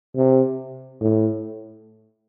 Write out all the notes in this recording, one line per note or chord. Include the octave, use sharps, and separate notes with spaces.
C3
A2